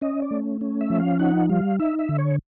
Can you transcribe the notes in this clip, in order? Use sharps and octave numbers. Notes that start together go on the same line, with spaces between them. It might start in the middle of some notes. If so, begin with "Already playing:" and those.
C#4 D#5
D5
A3
C#4
E5
F3
F5
D#4 F#5
G3 F5
D#4 E5
E5
D3
C#5